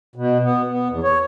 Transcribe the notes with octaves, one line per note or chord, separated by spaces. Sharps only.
B2
B3
B3
E2
C#5